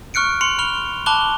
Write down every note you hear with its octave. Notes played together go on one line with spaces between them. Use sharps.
C#6 F6 F#6 C#7 D7
C6 C#7 F7
B5 F6 F7 G7
A5 B5 D6 F#6 F7 G7